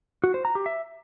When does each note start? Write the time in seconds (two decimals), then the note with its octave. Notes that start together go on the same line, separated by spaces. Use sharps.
0.24 F#4
0.34 C5
0.45 A#5
0.55 G4
0.66 E5